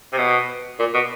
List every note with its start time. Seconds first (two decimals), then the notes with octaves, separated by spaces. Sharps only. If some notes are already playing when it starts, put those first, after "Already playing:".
0.13 C3
0.18 B2
0.79 A#2
0.94 B2